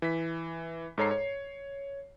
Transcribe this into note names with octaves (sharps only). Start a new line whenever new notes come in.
E3 B6
G#2 A4 C#5 A#5 C7
C#5